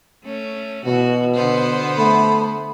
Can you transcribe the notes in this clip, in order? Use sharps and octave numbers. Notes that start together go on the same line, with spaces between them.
A3 C#4
B2 E3 F#4
D3 B3 C5
A3 B5